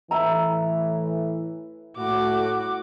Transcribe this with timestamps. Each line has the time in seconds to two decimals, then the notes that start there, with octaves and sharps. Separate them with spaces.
0.11 A2 E3 E4 A#5
1.97 A2 F#4 D6